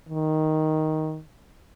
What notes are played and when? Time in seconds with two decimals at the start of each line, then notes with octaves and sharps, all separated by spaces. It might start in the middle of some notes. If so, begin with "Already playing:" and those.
0.09 D#3